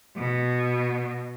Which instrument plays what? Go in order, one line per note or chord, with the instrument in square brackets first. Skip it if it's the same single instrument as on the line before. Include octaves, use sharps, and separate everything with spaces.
[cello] B2